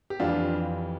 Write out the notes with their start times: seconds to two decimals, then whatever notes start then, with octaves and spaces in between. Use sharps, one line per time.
0.10 G4
0.20 F2 E3 G3 D4 F4